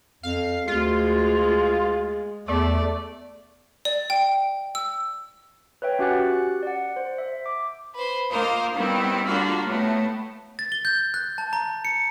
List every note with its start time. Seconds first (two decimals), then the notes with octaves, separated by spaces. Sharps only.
0.23 F2 F5
0.68 D2 G#3 F4
2.48 E2 A3 D5
3.85 D5
4.10 G5
4.75 E6
5.82 B4 C#5 E5 G5
5.99 C#4 F#4 G4 F#5 F#6 A6
6.63 D5 F#5
6.96 C5
7.18 E5
7.46 D6
7.94 B4 C5
8.31 A#3 F4 A#4 C5 D#5
8.75 D#3 G3 B3 C4 E4
9.25 D3 G3 A#3 F4 F#4
9.66 A2 A3 B3
10.59 A6
10.72 G7
10.85 G6
11.14 F#6
11.38 A5
11.53 A#5
11.85 C#7